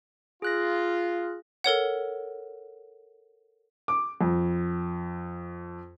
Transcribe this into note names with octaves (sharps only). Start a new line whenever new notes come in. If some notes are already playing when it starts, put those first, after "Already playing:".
F4 G#4 F#6 A#6
A4 A#4 C#5 F#5
D6
F2